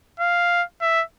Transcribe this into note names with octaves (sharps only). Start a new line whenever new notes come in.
F5
E5